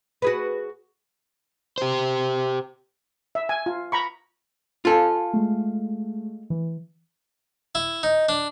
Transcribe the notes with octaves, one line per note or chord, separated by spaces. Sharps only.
F#4 G#4 B4
G4 C5
E5
G#5
F4
A#5 B5 C#6
F4 A4 F5 G#5
G#3 A3
E3
E4
D#4
D4